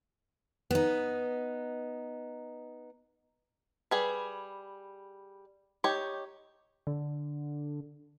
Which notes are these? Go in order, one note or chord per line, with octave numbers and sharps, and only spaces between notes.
B3 D#4
G3 G#4 B4
D#4 G4 C#5
D3